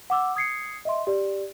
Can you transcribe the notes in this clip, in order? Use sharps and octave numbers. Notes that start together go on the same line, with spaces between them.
F#5 D6 E6
D#6 G#6 C7 C#7
D#5 E5 C6
G4 D5